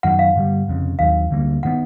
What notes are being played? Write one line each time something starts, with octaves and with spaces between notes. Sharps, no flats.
F#2 D#3 F#3 F#5
F5
G2 D3 G3
F1 F2 C#3
D#2 D#3 F#3 F5
D2 D3 G3 A#3
D#3 G#3 B3 F#5